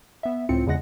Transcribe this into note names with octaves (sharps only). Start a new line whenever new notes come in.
B3 E5
C#2 A2 C4 F4 C#7
E2 C#3 G#3 F#5 A#6